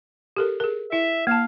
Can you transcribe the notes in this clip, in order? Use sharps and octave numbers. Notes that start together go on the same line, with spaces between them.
G4 A4 A#4
G#4 A#4
E4 E5
A#3 F5 A5